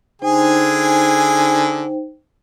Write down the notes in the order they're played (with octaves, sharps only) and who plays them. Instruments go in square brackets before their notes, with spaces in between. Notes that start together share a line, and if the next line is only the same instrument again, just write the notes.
[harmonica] D3 G#4 G#5 [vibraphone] D#4 C5 G5